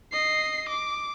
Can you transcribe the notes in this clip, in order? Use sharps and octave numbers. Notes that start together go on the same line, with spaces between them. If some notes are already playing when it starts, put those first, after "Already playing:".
D#5 C7
D6